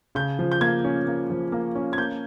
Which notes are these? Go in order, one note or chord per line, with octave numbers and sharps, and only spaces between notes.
C#3 G6
F3
G6
A#3 G#6
C#4
A#3
F3
A#3
C#4
G#6
A#3 G6